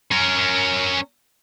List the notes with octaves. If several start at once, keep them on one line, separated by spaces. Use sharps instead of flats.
C#4 A#4